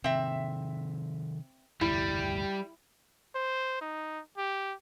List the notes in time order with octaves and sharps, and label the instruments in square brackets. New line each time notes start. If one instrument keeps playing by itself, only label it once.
[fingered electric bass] C3 D#3 [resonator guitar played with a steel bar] C4 E5
[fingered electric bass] F1 D2 G2 [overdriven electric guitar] G3 [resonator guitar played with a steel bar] E4
[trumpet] C5
D#4
G4